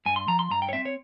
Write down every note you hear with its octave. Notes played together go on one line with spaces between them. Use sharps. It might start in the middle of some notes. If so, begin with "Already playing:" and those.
G2 G#5
C6
F3 A#5
C6
G2 A#5
G5
C#5
C4 E5
C#5